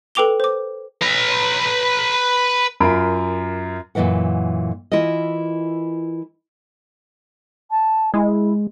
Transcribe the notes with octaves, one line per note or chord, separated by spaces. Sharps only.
A4 B4 G5 D6 F7 G7
C5 D6
B4 A#5
F#2 F4 A#4 B5 D7
F#2 A#2 C#3 E3 B4 F#5
E3 E4 F4 A#4 D#5
A5
G#3 E4